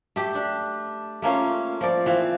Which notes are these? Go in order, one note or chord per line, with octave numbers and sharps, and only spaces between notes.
A3 G4
D4
A3 A#3 C#4 F4
F3 D5
E3 C4 F4